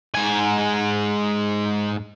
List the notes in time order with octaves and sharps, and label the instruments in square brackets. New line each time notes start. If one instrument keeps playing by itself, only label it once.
[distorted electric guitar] G#2 G#5